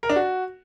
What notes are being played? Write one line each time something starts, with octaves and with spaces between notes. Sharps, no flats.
A#4
D4
F#4